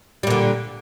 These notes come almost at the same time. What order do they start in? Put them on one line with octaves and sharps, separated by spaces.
G3 A#2 D3